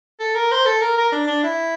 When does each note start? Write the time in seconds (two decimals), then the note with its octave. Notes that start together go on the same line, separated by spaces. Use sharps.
0.20 A4
0.35 A#4
0.52 C5
0.66 A4
0.81 A#4
0.97 A#4
1.12 D4
1.27 D4
1.44 E4